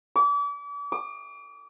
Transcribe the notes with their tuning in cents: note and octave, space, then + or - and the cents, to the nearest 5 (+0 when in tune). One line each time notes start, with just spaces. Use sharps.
D6 -40
D6 +35